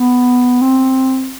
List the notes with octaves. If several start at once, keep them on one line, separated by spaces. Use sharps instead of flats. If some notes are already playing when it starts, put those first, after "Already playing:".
Already playing: B3
C4